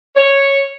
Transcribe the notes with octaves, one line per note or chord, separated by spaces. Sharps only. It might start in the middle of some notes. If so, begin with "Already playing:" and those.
C#5